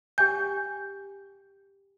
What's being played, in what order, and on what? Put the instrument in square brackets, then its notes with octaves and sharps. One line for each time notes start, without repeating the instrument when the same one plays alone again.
[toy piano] G4 G5 G#5 [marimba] G6